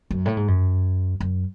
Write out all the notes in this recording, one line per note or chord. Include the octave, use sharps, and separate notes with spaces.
F#2
A2
G#2
F#2
F#2